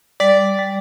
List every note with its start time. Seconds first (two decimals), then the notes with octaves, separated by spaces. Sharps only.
0.20 G3 D5
0.59 G3